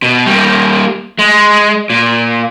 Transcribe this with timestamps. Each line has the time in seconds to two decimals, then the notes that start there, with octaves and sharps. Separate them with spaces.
0.02 B2
0.26 G3 A#3
1.19 G#3
1.90 A#2